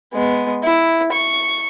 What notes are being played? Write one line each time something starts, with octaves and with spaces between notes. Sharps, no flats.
G#3 B3
E4
C#6